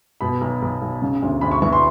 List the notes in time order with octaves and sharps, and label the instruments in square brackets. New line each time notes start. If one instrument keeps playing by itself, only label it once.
[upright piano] B2 B5
B1
B1
B1
C#3
D2
D2 B5
C#6
E3 C#6
C6